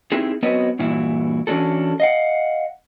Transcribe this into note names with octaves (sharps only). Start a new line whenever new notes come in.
C4 D#4 E4 G4 G#4
F#3 B3 C4 F#4 B4 D#5
G2 A#2 E3 E4 F#4
E3 C#4 D4 F#4 A4
D#5 F5 F#5